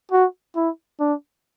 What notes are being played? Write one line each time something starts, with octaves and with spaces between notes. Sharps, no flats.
F#4
E4
D4